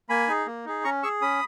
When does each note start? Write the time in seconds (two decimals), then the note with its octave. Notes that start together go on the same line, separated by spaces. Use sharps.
0.09 A#3 G#5 B5
0.28 D#4 G#4
0.47 A#3
0.65 D#4 G#4
0.84 C#4 A#5 C#6
1.03 G#4 C#6 E6
1.22 C#4 B5 D#6